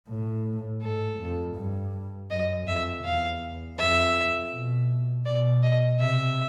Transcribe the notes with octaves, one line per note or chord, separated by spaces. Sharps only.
A2
G#2 A4
F2
G2
F#2 D#5
F2 E5
E2 F5
F2 E5
B2
B2 D5
D#5
C3 E5